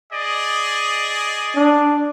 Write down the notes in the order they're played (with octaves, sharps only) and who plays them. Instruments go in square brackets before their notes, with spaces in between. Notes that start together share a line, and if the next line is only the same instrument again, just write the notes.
[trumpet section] G#4 D5 D#5
[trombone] D4